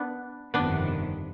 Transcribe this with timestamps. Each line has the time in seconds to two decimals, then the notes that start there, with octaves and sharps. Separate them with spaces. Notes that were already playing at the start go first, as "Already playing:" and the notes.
Already playing: B3 D4
0.54 G1 F2 C3 D#3 B3 D4